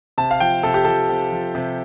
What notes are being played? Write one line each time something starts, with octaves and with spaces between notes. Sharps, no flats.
C3 A5
F5
F3 G5
C3 A4
G4
F3 A4
C3
F3
C3